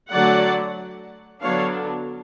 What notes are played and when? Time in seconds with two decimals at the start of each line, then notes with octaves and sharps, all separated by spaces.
0.12 D3 F#3 A3 D5 F#5
1.41 D3 F#3 B3 D4 C#5 F5